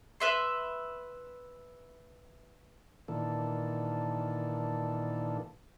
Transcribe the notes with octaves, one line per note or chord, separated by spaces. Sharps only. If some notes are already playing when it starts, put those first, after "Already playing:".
B4 E5 C6
A#2 D#3 E3 D4 A4